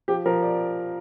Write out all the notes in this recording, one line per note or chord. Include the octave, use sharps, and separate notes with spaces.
F3 G4
F3 A#4
D5